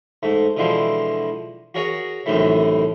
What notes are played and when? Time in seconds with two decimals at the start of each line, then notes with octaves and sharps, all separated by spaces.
0.23 G#2 A3
0.57 B2 D3 E3 F3 G#3
1.74 F#4 G#4 A#4 C#5 F#5
2.26 C2 F#2 A2 D#3 E3 A3